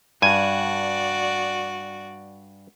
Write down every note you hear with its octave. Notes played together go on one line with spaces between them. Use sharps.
G2 F#4 D5 G#5